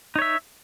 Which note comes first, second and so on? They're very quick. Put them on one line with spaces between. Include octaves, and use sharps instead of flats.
D#4 C#5 E5